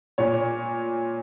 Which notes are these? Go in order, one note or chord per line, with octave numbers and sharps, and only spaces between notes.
A#2 C#5